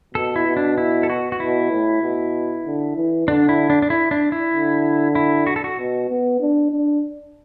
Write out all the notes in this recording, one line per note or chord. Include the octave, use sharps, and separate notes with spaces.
B2 A4
E4
B2
D4
E4
A4
F#4
F#4
B2 E4
A2
B2
D3
E3
D3 D4
E4
D4
D4
E4
D4
E4
D3
E4
F#4
A4
F#4
B2
B3
D4
D4